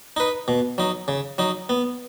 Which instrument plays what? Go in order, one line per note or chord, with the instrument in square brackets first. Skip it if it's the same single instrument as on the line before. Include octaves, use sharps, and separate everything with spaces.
[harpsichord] D#4 B4
B2
F#3 D#4
C#3
F#3 D#4
B3